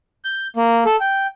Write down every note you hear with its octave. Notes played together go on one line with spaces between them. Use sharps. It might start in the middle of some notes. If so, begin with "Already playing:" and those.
G6
A#3
A4
G5